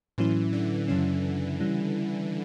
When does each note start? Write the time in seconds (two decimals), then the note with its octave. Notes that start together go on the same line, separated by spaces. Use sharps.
0.18 A2 E3 F#3 C#4 E4
0.53 D3
0.88 F#2 C#3 E3 F#3 C#4
1.60 C#3 G3 C#4 E4